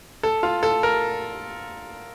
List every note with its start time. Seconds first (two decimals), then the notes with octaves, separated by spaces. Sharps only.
0.23 A4
0.43 F4
0.63 A4
0.83 A#4